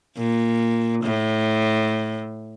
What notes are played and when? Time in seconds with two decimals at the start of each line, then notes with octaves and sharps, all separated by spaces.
0.17 A#2
1.03 A2